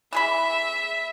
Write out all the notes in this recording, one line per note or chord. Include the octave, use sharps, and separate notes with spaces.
E3 G#4 E5 B5